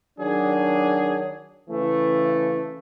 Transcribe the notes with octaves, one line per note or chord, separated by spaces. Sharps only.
D#3 F#3 D4 G#4
C#3 E3 A3